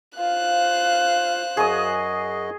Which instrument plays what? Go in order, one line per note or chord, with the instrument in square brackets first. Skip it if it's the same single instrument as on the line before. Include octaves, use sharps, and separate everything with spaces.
[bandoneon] F4 [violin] C5 F#6 [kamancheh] F5
[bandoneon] F#2 F#4 D#5 [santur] G#4 D#6